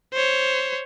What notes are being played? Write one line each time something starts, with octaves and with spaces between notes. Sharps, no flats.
C5 C#5